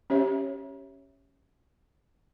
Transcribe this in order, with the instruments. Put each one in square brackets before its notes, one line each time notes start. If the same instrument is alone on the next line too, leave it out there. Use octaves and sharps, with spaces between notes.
[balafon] C#4 G4 C#5 E5